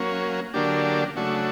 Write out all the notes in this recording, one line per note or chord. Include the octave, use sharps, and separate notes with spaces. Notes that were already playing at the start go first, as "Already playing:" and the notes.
Already playing: F#3 A#3 C#4
D3 F#3 A#3 D4 G4
C#3 F#3 A3 D4 F#4